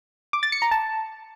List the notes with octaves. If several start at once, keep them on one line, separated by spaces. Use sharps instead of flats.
D6
A6
C#7
A#5
A5